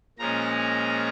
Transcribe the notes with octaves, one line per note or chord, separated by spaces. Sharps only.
A#2 F3 G#3 C#4 A#5